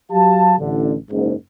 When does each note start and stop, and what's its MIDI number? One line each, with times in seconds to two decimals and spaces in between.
0.12 0.55 54
0.12 0.55 67
0.12 0.55 77
0.12 0.55 81
0.60 0.95 33
0.60 0.95 50
1.11 1.33 30
1.11 1.33 44